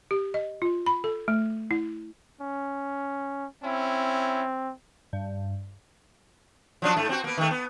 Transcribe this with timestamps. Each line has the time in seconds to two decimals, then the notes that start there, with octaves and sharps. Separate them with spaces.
0.11 G4
0.34 D#5
0.62 F4
0.86 B5
1.04 A4
1.28 A3
1.71 E4
2.41 C#4
3.64 C4 C#4 E4
5.13 G2
6.82 F3 F#3 D4
6.97 G#2 A3
7.09 C4 F#4
7.24 A#3 B3
7.38 D#3 A3
7.51 B3